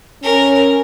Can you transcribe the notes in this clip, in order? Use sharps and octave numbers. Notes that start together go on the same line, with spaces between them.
C#4 A#4